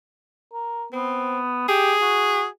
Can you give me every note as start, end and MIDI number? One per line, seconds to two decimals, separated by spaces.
0.53 0.86 70
0.92 1.64 59
0.92 1.39 60
1.69 1.94 67
1.69 2.46 68
2.02 2.47 66